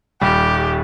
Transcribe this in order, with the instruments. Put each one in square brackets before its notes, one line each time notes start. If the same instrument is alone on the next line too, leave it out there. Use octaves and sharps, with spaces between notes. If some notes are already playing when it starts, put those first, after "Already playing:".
[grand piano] D#1 G3 [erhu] G4